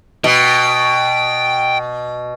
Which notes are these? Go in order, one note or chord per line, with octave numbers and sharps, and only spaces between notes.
B2 G5